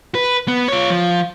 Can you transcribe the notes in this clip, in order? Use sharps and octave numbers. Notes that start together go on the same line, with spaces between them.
B4
B3
F4 C#5
F3